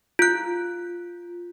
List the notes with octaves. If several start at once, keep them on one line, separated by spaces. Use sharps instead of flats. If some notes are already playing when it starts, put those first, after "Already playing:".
F4 F#6